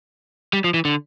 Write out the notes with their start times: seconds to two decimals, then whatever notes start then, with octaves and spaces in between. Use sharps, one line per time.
0.53 G3
0.64 F3
0.74 E3
0.85 D3